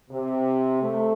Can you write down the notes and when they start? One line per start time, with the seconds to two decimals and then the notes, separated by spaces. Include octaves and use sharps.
0.11 C3
0.81 A3